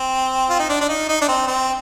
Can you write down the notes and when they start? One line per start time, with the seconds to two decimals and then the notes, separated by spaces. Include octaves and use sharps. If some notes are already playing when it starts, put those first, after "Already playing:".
Already playing: C4
0.49 F4
0.59 D#4
0.69 D4
0.81 D4
0.89 D#4
1.09 D#4
1.21 D4
1.28 C4
1.47 C4